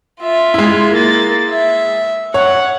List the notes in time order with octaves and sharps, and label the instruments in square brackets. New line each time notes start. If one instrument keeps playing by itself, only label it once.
[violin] F4 E5
[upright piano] G#3 E4
[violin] A#3 A6
E5
[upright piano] C#5 [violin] F#5